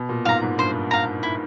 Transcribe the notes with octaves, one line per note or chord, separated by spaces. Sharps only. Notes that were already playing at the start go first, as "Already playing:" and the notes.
Already playing: B2
A#2
G#2 F5 A#5
G#2
G2 C5
F5 A#5
E4